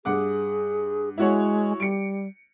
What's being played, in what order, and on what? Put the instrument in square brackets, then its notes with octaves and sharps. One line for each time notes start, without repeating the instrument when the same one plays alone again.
[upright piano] G2 F#5 D6 [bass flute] G#4
[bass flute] G#3 [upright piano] E4 F#4 C#5
[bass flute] G3 [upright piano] C#7 D7